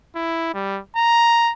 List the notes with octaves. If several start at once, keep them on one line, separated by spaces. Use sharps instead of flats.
E4
G3
A#5